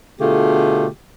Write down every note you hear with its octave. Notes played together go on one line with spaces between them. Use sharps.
B2 D3 A3 F4 G4 G#4